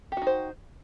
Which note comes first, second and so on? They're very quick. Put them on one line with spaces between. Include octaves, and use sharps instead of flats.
G4 F#4 D#4 C5